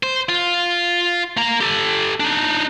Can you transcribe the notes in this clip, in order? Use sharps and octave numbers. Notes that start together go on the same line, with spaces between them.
C5
F4
A#3 A#5
G4 A4
D4 D#4